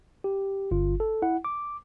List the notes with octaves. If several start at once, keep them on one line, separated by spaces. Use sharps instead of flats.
G4
G1 F4
A4
E4 F#5
D6